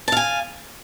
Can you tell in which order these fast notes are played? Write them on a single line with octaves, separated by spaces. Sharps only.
A5 F5 G#5